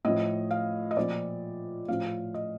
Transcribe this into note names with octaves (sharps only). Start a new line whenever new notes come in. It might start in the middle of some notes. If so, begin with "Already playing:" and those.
A2 F3 D#5
F5
D#5
A#2 F3 D5
A2 F3 F5
D#5